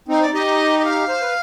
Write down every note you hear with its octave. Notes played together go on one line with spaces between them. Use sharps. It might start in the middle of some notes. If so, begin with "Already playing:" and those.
C4 D#4 C5
D5
D#4 G4 D#5
D#5
F5
C5
B4